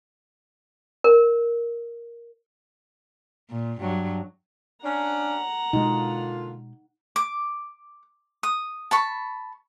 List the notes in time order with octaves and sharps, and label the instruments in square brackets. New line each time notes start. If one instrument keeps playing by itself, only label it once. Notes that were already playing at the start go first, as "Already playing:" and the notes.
[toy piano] A#4
[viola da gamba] A#2
G2 F#3
[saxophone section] C#4 D4 [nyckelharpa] F#5 A#5
[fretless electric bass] B2 G#3 [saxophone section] D3 A#3 F4 [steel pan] D#4
[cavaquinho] D6
D#6
A5 B5 C#6